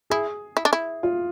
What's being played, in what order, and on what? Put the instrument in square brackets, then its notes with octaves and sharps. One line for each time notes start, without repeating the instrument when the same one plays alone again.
[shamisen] E4 [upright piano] G#4
[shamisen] E4
D4
E4
[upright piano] F4